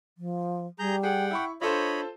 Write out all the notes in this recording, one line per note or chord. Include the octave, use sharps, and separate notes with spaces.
F3
G3 G#4 A#5 G6
G#4 F#5 G5
E4 B5 C#6
D4 F4 A4 C5 C#5 D#5 B5